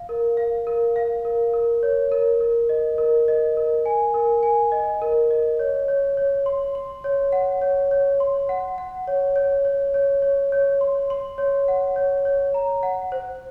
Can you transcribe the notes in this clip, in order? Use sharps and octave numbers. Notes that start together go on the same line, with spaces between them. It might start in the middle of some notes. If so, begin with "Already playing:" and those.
Already playing: F5
A#4
F5
A#4
F5
A#4
A#4
C#5
A#4
A#4
D#5
A#4
D#5
A#4
G#5
A#4
G#5
D#5
A#4
D#5
C#5
C#5
C#5
C6
C6
C#5
F#5
C#5
C#5
C6
F#5
F#5
C#5
C#5
C#5
C#5
C#5
C#5
C6
C6
C#5
F#5
C#5
C#5
A#5
F#5
C5